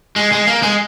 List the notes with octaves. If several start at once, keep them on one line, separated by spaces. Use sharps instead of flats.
G#3
G#3
A#3
G#3